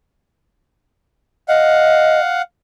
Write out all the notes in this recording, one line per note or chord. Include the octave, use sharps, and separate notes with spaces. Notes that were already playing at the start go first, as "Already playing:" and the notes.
D#5 F5 F#5